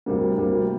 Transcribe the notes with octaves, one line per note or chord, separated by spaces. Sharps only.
D2 C3 G3 A#3
D2 C3 G3 A#3